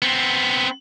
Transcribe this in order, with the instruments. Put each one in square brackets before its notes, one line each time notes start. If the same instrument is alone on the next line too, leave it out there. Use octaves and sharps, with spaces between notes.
[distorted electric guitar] B3 C4